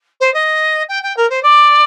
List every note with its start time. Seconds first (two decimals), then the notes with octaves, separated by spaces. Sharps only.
0.20 C5
0.34 D#5
0.88 G5
1.03 G5
1.16 A#4
1.30 C5
1.42 D5